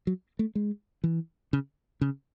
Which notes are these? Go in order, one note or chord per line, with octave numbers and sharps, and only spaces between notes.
F#3
A3
G#3
E3
C#3
C#3